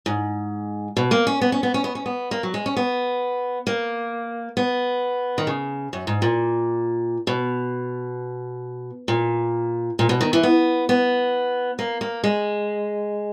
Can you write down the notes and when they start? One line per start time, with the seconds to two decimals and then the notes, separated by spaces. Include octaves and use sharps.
0.06 G#2
0.97 B2
1.11 A#3
1.27 C#4
1.41 B3
1.52 C#4
1.63 B3
1.74 C#4
1.84 B3
1.95 C#4
2.06 B3
2.31 A#3
2.43 F#3
2.54 G#3
2.66 C#4
2.77 B3
3.67 A#3
4.57 B3
5.38 D#3
5.47 C#3
5.93 F#2
6.07 G#2
6.22 A#2
7.27 B2
9.08 A#2
9.99 A#2
10.09 B2
10.21 D#3
10.33 E3
10.43 B3
10.89 B3
11.79 A#3
12.01 A#3
12.24 G#3